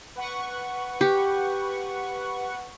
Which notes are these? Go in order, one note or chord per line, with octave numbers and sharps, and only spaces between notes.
B4 F#5 C#6
G4